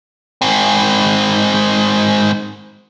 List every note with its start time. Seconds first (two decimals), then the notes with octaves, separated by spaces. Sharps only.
0.42 G#2 C4